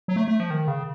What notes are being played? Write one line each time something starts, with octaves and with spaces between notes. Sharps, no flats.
F#3
A3
A3
F3
D#3
C#3